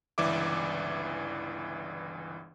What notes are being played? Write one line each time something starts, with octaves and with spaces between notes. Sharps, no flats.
G1 C#2 E3 D5 E5 D6